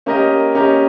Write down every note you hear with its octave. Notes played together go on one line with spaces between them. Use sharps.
A#3 C#4 G4 A#4 D#5
A#3 C#4 G4 A#4 D#5